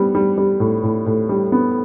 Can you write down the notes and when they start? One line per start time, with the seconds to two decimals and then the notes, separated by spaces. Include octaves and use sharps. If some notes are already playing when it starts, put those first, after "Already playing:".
Already playing: G3 B3
0.15 G3
0.38 G3
0.60 A2
0.83 A2
1.06 A2
1.29 G3
1.52 B3